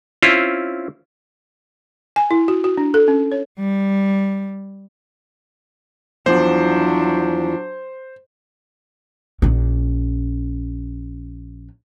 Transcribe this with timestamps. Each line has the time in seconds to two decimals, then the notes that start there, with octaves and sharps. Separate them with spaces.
0.22 C4 C#4 E4 F4
2.16 G#5
2.31 E4
2.48 F#4
2.64 F#4
2.78 D4
2.94 A4
3.08 C#4
3.32 C#5
3.60 G3
6.26 E2 F3 F#3 D4 C5
9.42 A#1 C#4